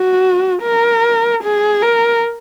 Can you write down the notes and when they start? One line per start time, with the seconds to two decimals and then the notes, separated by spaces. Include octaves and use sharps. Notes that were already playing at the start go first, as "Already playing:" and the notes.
Already playing: F#4
0.63 A#4
1.43 G#4
1.82 A#4